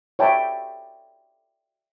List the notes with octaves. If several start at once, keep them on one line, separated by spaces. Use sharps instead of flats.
C#5 D5 E5 G5 A5 B5